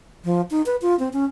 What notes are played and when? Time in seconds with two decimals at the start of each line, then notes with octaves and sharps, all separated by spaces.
0.25 F3
0.51 D#4
0.66 B4
0.82 F4
0.99 C4
1.13 C#4